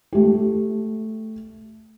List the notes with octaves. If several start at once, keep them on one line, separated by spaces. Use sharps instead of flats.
A3 G4